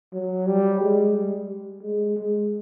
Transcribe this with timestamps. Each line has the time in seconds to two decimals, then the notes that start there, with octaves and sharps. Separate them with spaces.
0.13 F#3
0.46 G3
0.81 G#3
1.15 G3
1.82 G#3
2.16 G#3